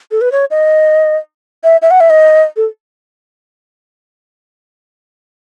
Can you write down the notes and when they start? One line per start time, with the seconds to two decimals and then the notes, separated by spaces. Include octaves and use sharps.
0.11 A4
0.21 B4
0.32 C#5
0.51 D#5
1.64 E5
1.82 E5
1.91 F#5
2.00 E5
2.10 D#5
2.57 A4